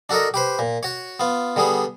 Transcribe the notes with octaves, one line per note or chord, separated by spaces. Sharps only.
D4 F#4 A4 A#4 D#5
G4 B4 C5
A#2
F#4 C#5
B3 F4
D3 G3 B3 G#4